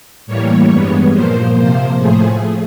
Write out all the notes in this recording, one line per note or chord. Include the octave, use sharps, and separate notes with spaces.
A2 E3 G3 A#3 C#5
G2 E3 G#3 B3
A#2 F3 A#3 C5
C3 F3 A#3 C5
A2 F3 A3 G#4